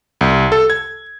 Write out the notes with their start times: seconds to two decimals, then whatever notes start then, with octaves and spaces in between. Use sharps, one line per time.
0.21 C2
0.52 A4
0.70 G#6